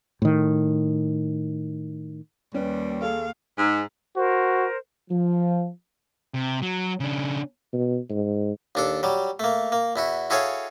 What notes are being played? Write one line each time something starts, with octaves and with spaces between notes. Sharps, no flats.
A2 D#3
D#2 G3 C#4 B4
G#4 A4 F5
G#2
F#4 A#4 C5
F3
C3
F#3
C#3 D4
B2
G#2
D#2 D4 A4
F#3 G3
A3 A#3
A#3
E2 E4 F#4
E4 F#4 G#4 A4 C#5 F5